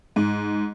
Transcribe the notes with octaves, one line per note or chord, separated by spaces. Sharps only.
G#2